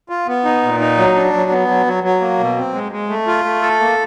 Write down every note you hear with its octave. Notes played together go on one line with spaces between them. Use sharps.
F4
B3
D#4
A#2
D#4
F#3
D4
F#3
B3
F#3
F#3
F#3
A#3
B2
C4
G#3
G#3
A3
F4
A3
A4
A#3